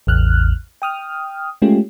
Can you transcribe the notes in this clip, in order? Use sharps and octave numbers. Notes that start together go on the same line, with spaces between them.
A1 E2 F6 F#6
G5 D#6 F6
G#3 A3 C#4 F4 G4